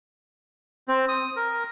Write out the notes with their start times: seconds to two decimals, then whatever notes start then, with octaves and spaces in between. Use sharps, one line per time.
0.88 C4
1.08 D#6
1.36 A#4